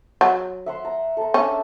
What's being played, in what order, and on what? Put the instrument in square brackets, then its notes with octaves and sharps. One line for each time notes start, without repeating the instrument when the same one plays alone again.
[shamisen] F#3
[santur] E5 F#5 C6
A#5
A4 A#5
[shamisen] C#4 [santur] D4 E5